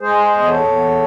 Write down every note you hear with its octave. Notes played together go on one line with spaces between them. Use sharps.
G#3 G#4 C5
E2
D#5
A4 C#5
E2